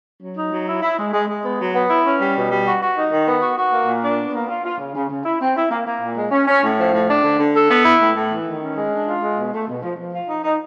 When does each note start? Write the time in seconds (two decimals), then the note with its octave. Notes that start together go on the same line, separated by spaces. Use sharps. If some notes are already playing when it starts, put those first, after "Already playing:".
0.21 F#3
0.36 D#4
0.51 F#3
0.67 E4
0.82 E4
0.97 G#3
1.12 G#3
1.27 G#3
1.43 B3
1.59 F#3
1.73 B3
1.89 E4
2.04 C#4
2.20 G3
2.35 B2
2.50 G3
2.65 F#4
2.81 F#4
2.95 D#4
3.10 D#3
3.26 B3
3.41 F#4
3.56 F#4
3.72 A#3
3.87 A#2
4.02 D4
4.18 B3
4.33 A#3
4.48 F4
4.64 F4
4.78 C#3
4.95 C#3
5.09 C#3
5.25 E4
5.40 C4
5.56 E4
5.70 A#3
5.86 A#3
6.01 A#2
6.17 G#3
6.31 C#4
6.47 C#4
6.62 A2
6.78 F3
6.92 A2
7.08 D4
7.22 D3
7.38 D3
7.54 A4
7.69 B3
7.83 E4
8.00 A2
8.14 A2
8.30 E3
8.45 D#3
8.60 C#4
8.75 G#3
8.91 D4
9.06 F4
9.21 G#3
9.36 B2
9.52 A3
9.67 B2
9.82 F3
9.97 F3
10.12 F4
10.29 D#4
10.43 D#4